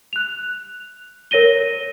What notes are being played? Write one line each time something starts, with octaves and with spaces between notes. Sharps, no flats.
F#6 F7
A#4 C#5 A#6 D#7 G7